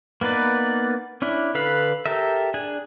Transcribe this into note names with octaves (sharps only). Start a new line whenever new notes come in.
A#3 B3 D#4 B4 D5
C#4 D4 E4
D3 A4 B4 F5 B5
G4 A4 A#4 E5
D4 G#4 G#5